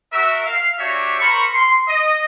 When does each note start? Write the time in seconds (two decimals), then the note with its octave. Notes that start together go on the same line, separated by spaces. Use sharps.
0.12 F#4 A#4 E5
0.45 F5
0.78 D4 F#4 G4 C#5 E5
1.19 A#4 C5 B5 C#6
1.54 C6
1.88 D#5